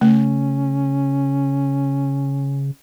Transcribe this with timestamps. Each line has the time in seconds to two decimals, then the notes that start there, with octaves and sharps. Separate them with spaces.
0.01 C#3 A3 C#4